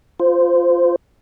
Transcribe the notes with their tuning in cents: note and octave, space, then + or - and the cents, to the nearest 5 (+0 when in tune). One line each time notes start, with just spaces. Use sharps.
F4 +0 C5 -15